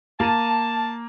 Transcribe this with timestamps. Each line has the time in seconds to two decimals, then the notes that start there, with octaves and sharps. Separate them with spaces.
0.20 A#3 A5 D#7